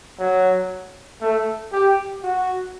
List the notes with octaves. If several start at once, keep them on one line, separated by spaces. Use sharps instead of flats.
F#3
A3
G4
F#4